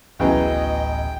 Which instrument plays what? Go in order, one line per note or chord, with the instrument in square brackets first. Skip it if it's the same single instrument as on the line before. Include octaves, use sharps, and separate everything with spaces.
[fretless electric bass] D1 A1 B3 [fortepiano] C#3 E3 F#3 [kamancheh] D#5 [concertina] G5